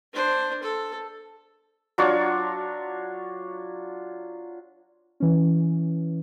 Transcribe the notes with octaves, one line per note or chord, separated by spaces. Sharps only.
D4 C5
A4
F#3 D4 F4 C#5
E3 C#4